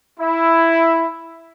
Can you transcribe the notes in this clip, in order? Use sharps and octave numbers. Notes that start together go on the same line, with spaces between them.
E4